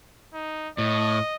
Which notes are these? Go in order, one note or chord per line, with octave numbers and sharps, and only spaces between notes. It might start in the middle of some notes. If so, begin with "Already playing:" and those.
D#4
A2 D#5